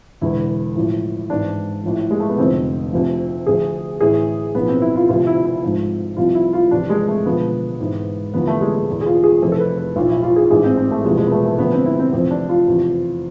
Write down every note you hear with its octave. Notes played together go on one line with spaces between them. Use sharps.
E1 E2 D3 E4
A1 A2 F3
G#1 G#2 E3 D4
A1 A2 F3
G#3
A3
B3
F1 F2 D3 C4
D2 C3 F3
D2 D3 F3 G#4
A1 A2 E3 G#4
B1 A2 F3 B3
C4
E4
F4
D2 C3 F3 F4
E4
E4
G#1 G#2 F3
C2 C3 F3 F4
E4
F4
E2 C3 F3 D4
G#3
A3
E1 D2 D3 F3 B3
G#1 G#2 E3
E2 D3 F3 B3
A3
G#3
G#3
E2 B2
G#4
F4
G#4
F1 F2 E3 A4
A4
B4
B4
B1 A2 F3 F4
E4
F4
G#4
A1 G#2 E3 G#4
C4
C4
A3
E1 E2 C3 F3 G#3
G#3
B3
A3
A3
D2 D3 F3 B3
C4
E4
C4
F1 F2 E3 C4
D4
F4
E2 C3 F3